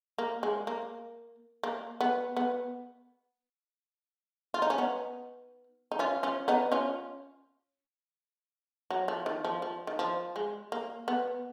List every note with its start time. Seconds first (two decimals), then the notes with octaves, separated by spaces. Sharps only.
0.18 A#3
0.43 G#3
0.67 A#3
1.63 A#3
2.01 B3
2.37 B3
4.54 F4
4.62 D#4
4.70 C#4
4.78 B3 D#4
5.92 D#4
5.99 C#4 F4
6.23 C#4 F4
6.48 B3 D#4
6.72 C#4 F4
8.90 F#3
9.08 F3
9.26 D#3
9.45 F3
9.62 F3
9.87 D#3
9.99 F3
10.36 G#3
10.72 A#3
11.08 B3